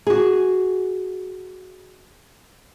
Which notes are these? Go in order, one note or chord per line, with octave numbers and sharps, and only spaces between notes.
F#4 G#4